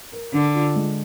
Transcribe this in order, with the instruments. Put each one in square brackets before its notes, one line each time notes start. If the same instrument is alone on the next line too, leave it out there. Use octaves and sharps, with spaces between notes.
[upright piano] A#4
[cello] D3 [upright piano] D4
[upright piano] F4
G#3